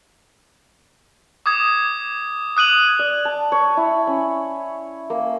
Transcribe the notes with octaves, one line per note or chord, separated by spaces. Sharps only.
D6 D#6 G#6
D#6 F#6 D#7 F#7
D5
A5
C#5
E4
C#4
A#3